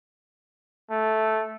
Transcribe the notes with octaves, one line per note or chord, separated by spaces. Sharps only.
A3